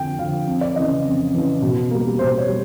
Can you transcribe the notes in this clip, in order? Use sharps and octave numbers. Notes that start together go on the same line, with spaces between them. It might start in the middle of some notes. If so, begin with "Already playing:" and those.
Already playing: F2 D3 F3 G5
D3 F3 F5
F2
D5
C#3 E3 D#5
F2
C#3 E3
B2
G3 A#3
B2 C5
C#5
G3